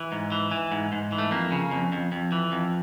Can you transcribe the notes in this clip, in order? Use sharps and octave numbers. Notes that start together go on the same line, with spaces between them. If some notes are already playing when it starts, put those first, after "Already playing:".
Already playing: E3
G#2
E3
E3
G#2
G#2
E3
A3
F2 A#3
C#3
F2
F2
F2
E3
F2